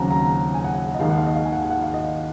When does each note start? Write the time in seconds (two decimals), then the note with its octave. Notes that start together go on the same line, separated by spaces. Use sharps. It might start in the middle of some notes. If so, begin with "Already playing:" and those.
Already playing: D#2 C#3 F#3 C4 F#5 A#5
0.11 A#5
0.54 G#5
0.64 F#5
0.94 D#5
0.99 D#2 D#3 G#3 F5
1.10 F#5
1.17 F5
1.26 D#5
1.35 F5
1.45 G#5
1.52 F#5
1.71 F#5
1.82 F5
1.94 D#5